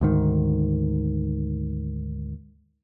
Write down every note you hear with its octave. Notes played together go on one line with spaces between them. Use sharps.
D2 G#2 D#3